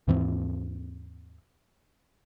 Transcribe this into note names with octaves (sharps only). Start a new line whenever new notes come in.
D#2 G#2 E3 C4